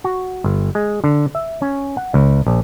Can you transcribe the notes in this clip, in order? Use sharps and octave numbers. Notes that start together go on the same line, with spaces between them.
F#4
G1
G#3
D3
E5
C#4
F#5
C#2
A#1